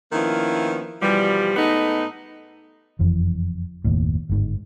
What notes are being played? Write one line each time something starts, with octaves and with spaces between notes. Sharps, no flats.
D#3 F3 A#3 B3 C#4 E4
B2 E3 F3 G3
G#2 A3 B3 D#4
F#1 F2 E3
F#1 D#2 A2
G1 G#2